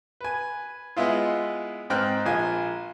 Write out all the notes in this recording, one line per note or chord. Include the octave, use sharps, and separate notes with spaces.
B4 G#5
G#3 B3 E4 F4
G#2 C4 G5 F6 F#6
A#1 F4 G#5